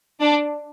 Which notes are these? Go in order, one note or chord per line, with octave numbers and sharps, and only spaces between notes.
D4